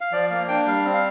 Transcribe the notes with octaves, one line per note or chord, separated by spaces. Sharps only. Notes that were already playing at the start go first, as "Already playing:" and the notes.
F5
F3 D5
A#3 F5
D4 G5
G3 F5
C4
F5